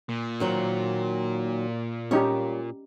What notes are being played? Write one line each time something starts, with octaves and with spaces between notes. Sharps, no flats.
A#2
D#3 F#3 C5
G3 C#4 D#4 G4 C#5